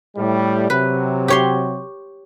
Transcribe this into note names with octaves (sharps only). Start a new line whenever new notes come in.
A2 G3
C3 F#3 B4
G4 C#5 C6